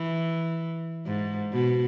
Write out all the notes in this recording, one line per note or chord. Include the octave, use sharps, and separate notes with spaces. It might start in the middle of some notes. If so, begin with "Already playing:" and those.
Already playing: E3
G#2
B2